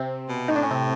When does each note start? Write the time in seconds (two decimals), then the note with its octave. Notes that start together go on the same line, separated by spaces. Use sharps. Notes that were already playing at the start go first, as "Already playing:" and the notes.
Already playing: C3 C4
0.29 B2
0.48 A2 D#4
0.56 D4
0.63 C#4
0.71 C3 C4